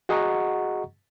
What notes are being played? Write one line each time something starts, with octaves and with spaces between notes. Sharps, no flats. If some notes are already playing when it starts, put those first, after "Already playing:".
F#4 G#4 D#5 F#5 A#5 C#6